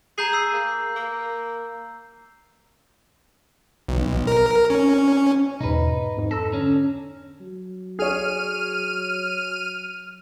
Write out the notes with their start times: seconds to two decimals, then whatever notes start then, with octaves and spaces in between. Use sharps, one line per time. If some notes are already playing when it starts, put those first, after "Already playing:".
0.18 G#4 A#5 G6 C7
0.33 E6 C7
0.53 A#3
0.96 A#3
3.88 B1
4.27 A#4
4.70 C#4
5.61 E2 G#2 B2 D#4 B4
6.17 F2 G#2
6.31 A4 A#5 E6 A#6
6.52 D3 C#4
7.41 F#3
7.99 G#4 C#5 F6 D#7